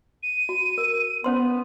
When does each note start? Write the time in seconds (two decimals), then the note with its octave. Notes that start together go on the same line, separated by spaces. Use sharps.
0.23 D#7
0.49 F#4
0.78 A#4
1.24 B3 C#4 C5 C6